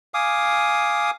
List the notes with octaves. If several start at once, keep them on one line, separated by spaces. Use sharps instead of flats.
F5 G#5 D6 D#6